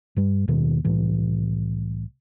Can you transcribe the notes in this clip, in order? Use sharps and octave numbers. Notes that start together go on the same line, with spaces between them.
G2 G3
D#2 B2 D#3
C2 A2 E3